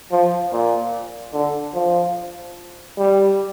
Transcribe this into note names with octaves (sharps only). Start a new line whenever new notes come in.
F3
A#2
D3
F3
G3